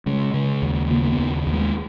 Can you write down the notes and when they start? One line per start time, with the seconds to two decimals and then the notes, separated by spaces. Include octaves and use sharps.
0.06 C#3 G#3
0.34 C#3
0.62 D#2
0.90 C#3 A#3
1.02 A#3
1.12 B3
1.18 D#2
1.47 D#2
1.53 G#3